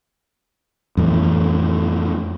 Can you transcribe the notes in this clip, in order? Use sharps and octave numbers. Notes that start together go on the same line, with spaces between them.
F2 A2 E3